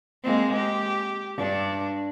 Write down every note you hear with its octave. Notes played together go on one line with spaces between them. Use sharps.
G#3 A#3 C4
G4
G2 D4 D5